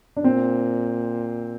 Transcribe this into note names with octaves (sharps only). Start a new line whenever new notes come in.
D4
A#2 C4